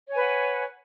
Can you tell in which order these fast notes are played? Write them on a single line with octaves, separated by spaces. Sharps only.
C#5 G#5 B4 F#5